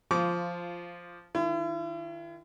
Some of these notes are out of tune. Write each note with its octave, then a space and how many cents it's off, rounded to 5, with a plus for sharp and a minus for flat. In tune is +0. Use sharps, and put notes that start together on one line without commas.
F3 +0 F4 -10 D6 -30
D#3 +0 E4 +45